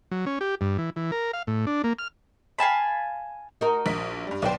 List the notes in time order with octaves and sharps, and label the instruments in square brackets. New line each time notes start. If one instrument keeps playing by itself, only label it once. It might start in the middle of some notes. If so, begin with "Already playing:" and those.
[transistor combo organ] F#3
C#4
G4
G2
E3
E3
A#4
F5
A2
D4
A#3
F6
[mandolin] F5 G#5 A5 B5
[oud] D#4 F#4 A#4
[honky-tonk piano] A#1 B6
G2 G3
[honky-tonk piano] B1 G5 [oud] D4 B4 C5